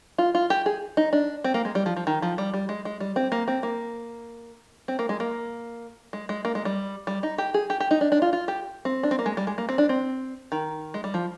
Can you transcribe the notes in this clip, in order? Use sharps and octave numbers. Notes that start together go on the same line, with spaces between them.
F4
F4
G4
G#4
D#4
D4
C4
A#3
G#3
G3
F3
F3
D#3
F3
G3
G3
G#3
G#3
G3
C4
A#3
C4
A#3
C4
A#3
G#3
A#3
G#3
G#3
A#3
G#3
G3
G3
D#4
G4
G#4
G4
G4
D#4
D4
D4
F4
F4
G4
C4
D4
C4
A#3
G#3
G3
G#3
A#3
C4
D4
C4
D#3
G#3
G3
F3